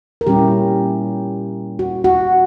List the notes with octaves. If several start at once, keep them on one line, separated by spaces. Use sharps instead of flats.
A#4
A#2 G3 C#4 E4 G4
F#4
F#4